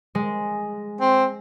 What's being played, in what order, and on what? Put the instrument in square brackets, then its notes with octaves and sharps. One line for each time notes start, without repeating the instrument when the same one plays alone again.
[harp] G#3
[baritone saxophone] C4